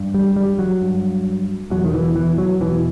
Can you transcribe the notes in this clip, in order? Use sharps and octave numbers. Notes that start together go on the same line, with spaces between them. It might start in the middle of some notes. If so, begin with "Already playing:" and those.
Already playing: G2
G3
G3
F#3
G2
E2 B2 F#3
D#3
E3
E3
F#3
E2 B2 E3